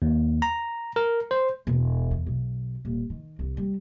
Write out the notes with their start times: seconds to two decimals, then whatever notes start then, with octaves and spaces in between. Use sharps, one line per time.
0.02 D#2
0.42 A#5
0.96 A#4
1.31 C5
1.67 E1
2.11 E2
2.27 B1
2.85 D#1
3.10 D#3
3.39 C2
3.57 G3